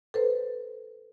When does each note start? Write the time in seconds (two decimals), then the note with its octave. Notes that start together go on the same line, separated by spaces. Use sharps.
0.14 A4 B4 C5